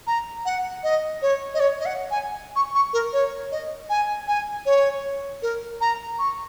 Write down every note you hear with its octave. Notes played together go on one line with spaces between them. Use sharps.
A#5
F#5
D#5
C#5
D#5
C#5
D#5
F#5
G#5
C#6
C#6
A#4
C#5
D#5
G#5
G#5
C#5
A#4
A#5
C#6